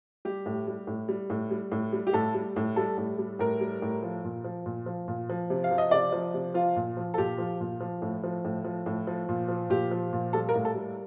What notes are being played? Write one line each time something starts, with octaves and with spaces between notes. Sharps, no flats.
G3 G4
A2
G3
A2
G3
A2
G3
A2
G3
G4
A2 A4
G3
A2
G3 A4
A2
G3
A2 A#4
G3
A2
F3
A#2
F3
A#2
F3
A#2
F3
C3
F5
F3
D#5
C3 D5
F3
C3
F3 F4
A#2
F3
A4
A#2 G4
F3
A#2
F3
A2
F3
A2
F3
A2
F3
A#2
F3
A#2 G4
F3
A#2
G3 A4
A#4
A2
A4
G3